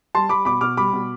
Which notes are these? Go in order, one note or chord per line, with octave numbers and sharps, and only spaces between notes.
G3 A5 C6
G3 B5 D6
B2 B5 D6
B2 D6 F6
G3 B5 D6
B2